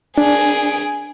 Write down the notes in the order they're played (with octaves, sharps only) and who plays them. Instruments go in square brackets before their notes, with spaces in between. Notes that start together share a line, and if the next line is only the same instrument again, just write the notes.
[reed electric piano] D4 [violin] G#4 D7